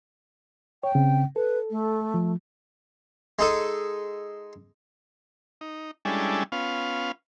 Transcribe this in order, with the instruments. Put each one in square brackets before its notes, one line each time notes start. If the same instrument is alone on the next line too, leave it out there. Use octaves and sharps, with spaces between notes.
[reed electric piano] C#5 [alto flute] G5
[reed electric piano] C#3 C4
[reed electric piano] A4 [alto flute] B4
[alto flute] A3
[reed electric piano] F3
[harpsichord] G#3 D#4 A4
[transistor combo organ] D#4
G3 G#3 C#4 D4 E4 A4
B3 C#4 F4 F5